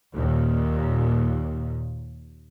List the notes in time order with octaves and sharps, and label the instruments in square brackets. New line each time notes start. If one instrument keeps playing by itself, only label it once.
[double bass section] D#2 A#2